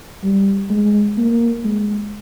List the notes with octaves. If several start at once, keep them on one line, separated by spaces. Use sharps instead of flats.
G3
G#3
A#3
G#3